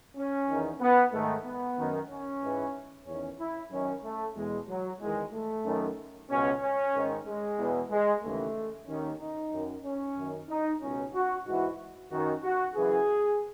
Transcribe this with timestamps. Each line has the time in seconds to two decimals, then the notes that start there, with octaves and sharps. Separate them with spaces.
0.16 C#4
0.48 E2 D#3
0.81 B3
1.12 G#2 D#3 A3
1.45 B3
1.77 F#2 D#3
2.10 C#4
2.42 G#2 E3
3.06 E2 D#3 C#4
3.39 E4
3.71 F#2 D#3 C#4
4.03 A3
4.36 E2 B2 G#3
4.68 F#3
5.00 E2 D#3 G#3
5.33 A3
5.65 F#2 D#3
6.29 C#2 B2 C#4
6.62 C#4
6.94 G#2 D#3
7.26 G#3
7.58 E2 B2
7.91 G#3
8.23 D#2 C#3 E3 A3
8.87 D#2 D#3 C#4
9.20 D#4
9.53 F#2 D#3
9.85 C#4
10.17 F#2 D#3
10.49 D#4
10.81 C#2 B2 C#4
11.13 F#4
11.46 G#2 E3 F#4
12.11 F#2 D#3 F#4
12.43 F#4
12.75 F#2 C#3 E3 G#4